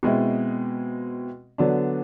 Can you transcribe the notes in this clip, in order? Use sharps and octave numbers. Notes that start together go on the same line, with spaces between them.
B2 G#3 C4 E4
D3 F#3 B3 D4